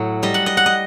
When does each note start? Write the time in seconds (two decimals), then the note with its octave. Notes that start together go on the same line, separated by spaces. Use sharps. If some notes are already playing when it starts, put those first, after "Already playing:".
Already playing: A2 F#3
0.23 G3 D#5
0.34 F#5
0.46 D#5
0.57 F#5
0.66 D#5